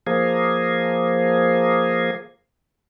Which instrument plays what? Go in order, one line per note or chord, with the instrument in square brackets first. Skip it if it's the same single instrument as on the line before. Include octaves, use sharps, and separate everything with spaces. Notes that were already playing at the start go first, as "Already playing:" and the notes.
[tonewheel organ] F3 A#3 G#4